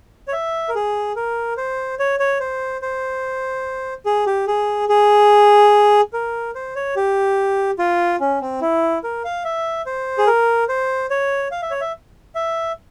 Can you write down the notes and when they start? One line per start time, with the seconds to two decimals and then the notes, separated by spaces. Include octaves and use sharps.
0.28 C#5
0.33 E5
0.69 A#4
0.75 G#4
1.16 A#4
1.57 C5
1.99 C#5
2.20 C#5
2.40 C5
2.82 C5
4.06 G#4
4.27 G4
4.47 G#4
4.89 G#4
6.13 A#4
6.55 C5
6.76 C#5
6.96 G4
7.79 F4
8.20 C#4
8.41 C4
8.61 E4
9.04 A#4
9.24 F5
9.44 E5
9.86 C5
10.18 G#4
10.27 A#4
10.69 C5
11.11 C#5
11.51 F5
11.62 E5
11.71 C#5
11.81 E5
12.35 E5